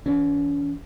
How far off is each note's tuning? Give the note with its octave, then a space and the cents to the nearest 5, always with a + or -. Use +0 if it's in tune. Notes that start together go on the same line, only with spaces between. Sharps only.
E3 +0 C#4 +40